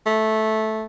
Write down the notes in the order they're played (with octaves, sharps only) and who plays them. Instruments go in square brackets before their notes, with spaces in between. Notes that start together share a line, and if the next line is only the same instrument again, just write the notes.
[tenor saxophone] A3